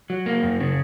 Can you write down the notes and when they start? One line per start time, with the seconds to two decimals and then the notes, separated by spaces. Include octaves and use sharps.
0.10 F#3
0.26 A#3
0.43 F#2
0.60 C#3